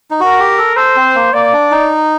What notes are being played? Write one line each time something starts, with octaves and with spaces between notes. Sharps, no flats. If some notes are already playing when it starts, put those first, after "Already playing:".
D#4
F#4 A#4
G4
A4
A4 C5
C4
A#3
A#3 D5
D4
D#4